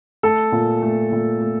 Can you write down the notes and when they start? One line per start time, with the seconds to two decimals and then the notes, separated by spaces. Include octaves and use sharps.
0.23 A3 A4
0.52 A#2
0.82 A3
1.12 A#2
1.41 A3